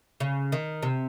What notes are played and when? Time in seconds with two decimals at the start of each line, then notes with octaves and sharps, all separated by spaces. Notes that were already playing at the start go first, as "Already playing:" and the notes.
0.20 C#3
0.52 D#3
0.83 C3